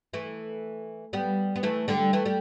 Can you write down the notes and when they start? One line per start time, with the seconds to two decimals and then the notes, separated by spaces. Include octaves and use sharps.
0.14 E3 A3
1.13 G3 B3
1.56 B3
1.63 E3 A3
1.88 D3 G3
2.13 E3 A3
2.26 G3